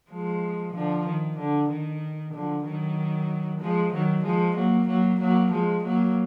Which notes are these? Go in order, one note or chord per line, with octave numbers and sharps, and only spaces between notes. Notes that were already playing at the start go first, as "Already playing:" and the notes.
F3 G#3
D3 F3
D#3
D3
D#3
D3 F3
D#3 F#3
F3 G#3
D#3 F#3
F3 G#3
F#3 A#3
F#3 A#3
F#3 A#3
F3 G#3
F#3 A#3